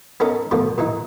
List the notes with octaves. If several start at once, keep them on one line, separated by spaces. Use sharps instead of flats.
B3 C#4 D#4 A4 A#4 A#5
B2 D3 D#3 F3 A3 B3
A#2 E3 D#4